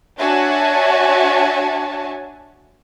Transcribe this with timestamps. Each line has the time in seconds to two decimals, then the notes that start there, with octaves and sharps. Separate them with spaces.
0.20 D4 F#4 C#5 E5 G#5 A5